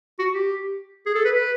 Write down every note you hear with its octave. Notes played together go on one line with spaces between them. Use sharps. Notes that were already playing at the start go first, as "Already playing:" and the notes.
F#4
G4
G#4
A4
B4
B4